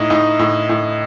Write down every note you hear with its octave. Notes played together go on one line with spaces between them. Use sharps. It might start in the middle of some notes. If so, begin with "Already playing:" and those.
Already playing: A2 D#4
A2 D#4
A2
A2